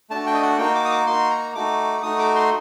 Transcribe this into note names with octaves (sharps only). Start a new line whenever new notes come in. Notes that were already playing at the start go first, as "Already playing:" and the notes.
A3 D4 F#4 A5
G5
D#5
F#5
A#3 D#4 F#4 G5
D6
D#6
D6
A#3 D#4 F#4 C6
A#5
A3 D#4 F#4 D6
A3 D#4 F#4 D#6
D6
C6